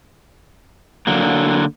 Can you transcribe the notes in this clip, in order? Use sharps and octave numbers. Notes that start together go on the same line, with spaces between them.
D3 F#3 A#3